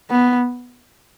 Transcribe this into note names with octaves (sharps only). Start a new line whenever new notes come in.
B3